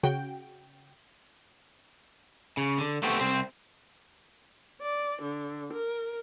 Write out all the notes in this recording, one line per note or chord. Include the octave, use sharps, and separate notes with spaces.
C#3 F#4 G5
C#3
D3
A3 B3 C4 F#4 G4 A4
C2 C4 C5
D5
D3
A#4